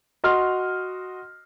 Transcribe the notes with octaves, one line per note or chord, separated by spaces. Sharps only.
F#4 D#5 C6 F6